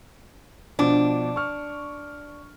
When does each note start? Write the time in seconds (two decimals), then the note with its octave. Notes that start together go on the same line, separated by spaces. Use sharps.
0.79 B2 F3 D4 D6
1.36 C#6 F6